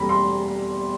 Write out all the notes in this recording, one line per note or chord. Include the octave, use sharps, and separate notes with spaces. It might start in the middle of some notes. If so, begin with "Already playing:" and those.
Already playing: E2 B2 G3 C4 A#5 B5
C6